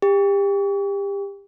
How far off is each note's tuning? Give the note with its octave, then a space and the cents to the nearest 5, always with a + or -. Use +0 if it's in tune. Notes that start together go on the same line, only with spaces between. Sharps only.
G4 +30